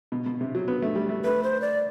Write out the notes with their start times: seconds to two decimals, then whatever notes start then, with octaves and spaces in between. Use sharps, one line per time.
0.12 B2
0.26 B2
0.41 C3
0.55 F#3
0.68 B3
0.82 A3
0.95 G3
1.09 A3
1.24 A3 B4
1.43 C5
1.62 D5